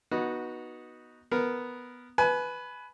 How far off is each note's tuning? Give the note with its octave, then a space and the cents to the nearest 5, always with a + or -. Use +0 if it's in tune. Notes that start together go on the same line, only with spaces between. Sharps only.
B3 -20 D#4 +0 F#4 -5
B3 +0 A#4 +0
B4 +0 G#5 +30